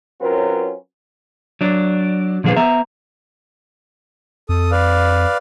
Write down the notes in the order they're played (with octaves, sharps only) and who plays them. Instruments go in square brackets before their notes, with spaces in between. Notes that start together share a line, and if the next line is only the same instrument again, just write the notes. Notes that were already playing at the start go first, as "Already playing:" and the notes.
[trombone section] F#3 C4 C#4 F4 A#4 B4
[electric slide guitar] F#3 D4
A#2 D3 F3 G#4 B4 F5
B3 E5 A#5
[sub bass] F2 [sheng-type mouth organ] A4 D#6
[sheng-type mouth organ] B4 D5 F5